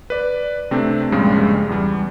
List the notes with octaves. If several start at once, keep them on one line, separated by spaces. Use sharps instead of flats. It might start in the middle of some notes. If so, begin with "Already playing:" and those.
B4 D5
C3 A3 C4 D4
A#1 G2 C#3 G3 G#3
E2 G3